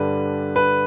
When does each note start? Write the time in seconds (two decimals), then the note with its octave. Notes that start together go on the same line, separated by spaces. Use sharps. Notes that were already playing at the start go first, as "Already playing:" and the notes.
Already playing: G2 D3 G3 B4
0.56 B4